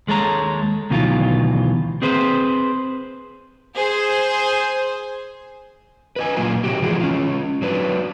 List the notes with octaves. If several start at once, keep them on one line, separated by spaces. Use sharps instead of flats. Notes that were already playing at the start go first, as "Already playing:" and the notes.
D#2 G#3 A4 C#5 A#5
D2 B2 D#3 E3 F#3 F4
C4 G#4 B4 C5
G#4 C5
B4 D#5 G#5
A#2 F#3 A#3 F4 G#5
C3 F#3 F#4 G4
E3 F3 G#3 A3 G#4
C#4 F4
F#3 D4 B4